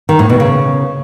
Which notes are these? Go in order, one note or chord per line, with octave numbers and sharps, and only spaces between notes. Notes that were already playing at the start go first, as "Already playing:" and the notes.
D#3
A2
B2
C#3